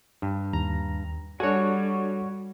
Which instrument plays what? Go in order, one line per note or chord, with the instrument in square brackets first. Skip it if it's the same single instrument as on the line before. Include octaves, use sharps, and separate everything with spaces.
[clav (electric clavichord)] G2
[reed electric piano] D#2 [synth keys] A#5
[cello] G3 [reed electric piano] D4 A4 D5 [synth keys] F#4 C#5 [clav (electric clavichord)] G#5